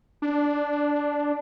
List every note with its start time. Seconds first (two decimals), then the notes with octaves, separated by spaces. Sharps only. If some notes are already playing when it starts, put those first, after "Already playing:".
0.22 D4